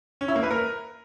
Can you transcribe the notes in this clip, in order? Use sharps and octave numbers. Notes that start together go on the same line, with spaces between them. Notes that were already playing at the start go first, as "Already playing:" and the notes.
C#4
E4
A#3
B4
A#4